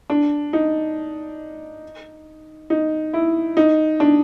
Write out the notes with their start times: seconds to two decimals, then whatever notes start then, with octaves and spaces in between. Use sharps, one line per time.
0.10 D4
0.53 D#4
2.70 D#4
3.13 E4
3.57 D#4
4.00 D4